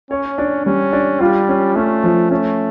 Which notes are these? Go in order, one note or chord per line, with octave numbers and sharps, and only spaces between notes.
C#4 C#5
D4
G3 C#4
D4
G3 F4
C#4
A3 C#4
F3
A3 C#4